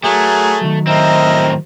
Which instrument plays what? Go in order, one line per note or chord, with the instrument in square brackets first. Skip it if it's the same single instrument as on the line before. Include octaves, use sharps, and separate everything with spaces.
[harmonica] F#3 G#4 A#4 [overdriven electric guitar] A3
[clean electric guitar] D#3 F#3
[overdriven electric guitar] A2 C4 [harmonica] A#4 D#5 E5